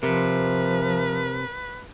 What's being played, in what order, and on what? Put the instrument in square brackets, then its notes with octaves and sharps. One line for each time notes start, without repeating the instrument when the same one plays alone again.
[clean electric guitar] C3 [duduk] F3 [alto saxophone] A#4 [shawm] B4